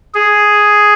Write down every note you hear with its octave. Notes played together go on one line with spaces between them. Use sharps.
G#4